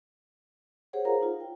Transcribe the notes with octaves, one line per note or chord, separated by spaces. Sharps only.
G4 G#4 C5 C#5 F#5
F4 G#4 A#4 C5 F5 A#5
D#4 F4
G5